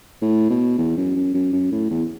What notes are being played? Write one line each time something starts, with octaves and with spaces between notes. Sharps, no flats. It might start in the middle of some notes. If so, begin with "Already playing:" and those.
A2
B2
E2
F#2
F#2
F#2
F#2
A2
E2